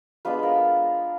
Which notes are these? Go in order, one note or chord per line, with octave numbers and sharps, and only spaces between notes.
G#3 B3 D4 F4 B4
A#4